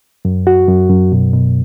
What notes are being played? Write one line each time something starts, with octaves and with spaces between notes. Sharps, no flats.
F#2
F#4
F#2
F#2
B2
B2